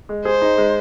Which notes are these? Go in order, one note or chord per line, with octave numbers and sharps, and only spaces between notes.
G#3
G#4 C5
D#4
G#3